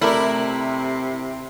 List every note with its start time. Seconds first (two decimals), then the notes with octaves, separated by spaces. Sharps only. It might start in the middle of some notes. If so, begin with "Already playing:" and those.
0.01 C3 A3 E4 A#4 D5